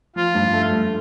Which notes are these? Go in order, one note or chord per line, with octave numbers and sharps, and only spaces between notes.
F3 F4
G2
A3
G2